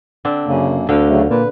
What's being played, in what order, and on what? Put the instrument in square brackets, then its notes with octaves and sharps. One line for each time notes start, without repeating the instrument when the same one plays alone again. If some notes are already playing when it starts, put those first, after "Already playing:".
[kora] D3 C4 D4
[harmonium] F#2 A#3 [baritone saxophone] C#3
[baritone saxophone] D2 [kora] D3 F5 G5
[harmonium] C#3 F#3 A3
[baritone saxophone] A#2 [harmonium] B4